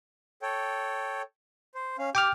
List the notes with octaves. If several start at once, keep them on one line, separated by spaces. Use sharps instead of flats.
A4 C#5 G5
C5
C#4 F5
G4 G5 D6 F6